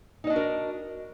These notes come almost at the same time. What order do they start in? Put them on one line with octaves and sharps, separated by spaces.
D#4 D#5 D4 F#4 A#4